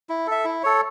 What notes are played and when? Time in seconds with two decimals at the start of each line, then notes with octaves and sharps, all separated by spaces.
0.09 E4
0.27 A4 E5
0.45 E4
0.63 A4 C#5